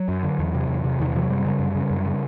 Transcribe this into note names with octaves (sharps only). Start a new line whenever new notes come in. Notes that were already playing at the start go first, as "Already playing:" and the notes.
Already playing: F#3
F#2
D3
E2
C3
E2
C3
E2 D#3
E3
C3 F3
F#3
F#2 G3
C#3
F#2
C#3
F#2
C#3